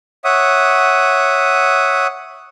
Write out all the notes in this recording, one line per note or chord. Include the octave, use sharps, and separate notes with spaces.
C#5 E5 F#5 D#6